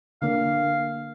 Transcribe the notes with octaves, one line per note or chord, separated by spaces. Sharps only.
D3 A#3 F5